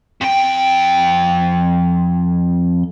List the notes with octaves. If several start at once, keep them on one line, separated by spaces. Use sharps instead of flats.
F2 G5